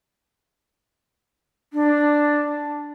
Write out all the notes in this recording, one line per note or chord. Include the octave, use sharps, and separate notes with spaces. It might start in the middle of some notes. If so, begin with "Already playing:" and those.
D4